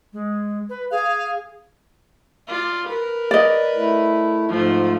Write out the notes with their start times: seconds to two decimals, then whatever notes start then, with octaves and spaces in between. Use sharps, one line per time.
0.13 G#3
0.70 B4
0.91 G#4 F5
2.48 F4 D5
2.87 A#4 B4
3.31 D5 D#5
3.75 A3 E4
4.49 G#2 F3 A3 F4